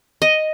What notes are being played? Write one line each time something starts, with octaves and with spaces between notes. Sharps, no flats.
D#5